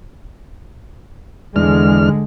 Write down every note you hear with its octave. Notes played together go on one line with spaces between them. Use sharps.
E2 D3 G#3 D4 F6